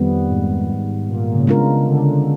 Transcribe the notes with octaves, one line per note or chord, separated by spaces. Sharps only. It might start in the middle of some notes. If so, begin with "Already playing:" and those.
Already playing: F2 D#3 G3 B3
G#2
A#2
A#2
C#3
G#3 B3 D4 F4 A#4
D3